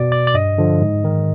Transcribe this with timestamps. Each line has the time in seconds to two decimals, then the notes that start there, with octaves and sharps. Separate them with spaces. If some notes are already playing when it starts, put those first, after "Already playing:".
Already playing: B2 D5
0.12 D5
0.27 D5
0.34 G2 D#5
0.58 D3 F3
0.81 G#2
1.04 D#3